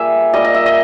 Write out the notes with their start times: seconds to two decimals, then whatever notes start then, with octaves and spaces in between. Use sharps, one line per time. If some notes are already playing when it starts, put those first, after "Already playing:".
Already playing: A#2 G3 G#4 E5
0.33 A#2 G3 D#5
0.44 D#5
0.54 E5
0.66 D#5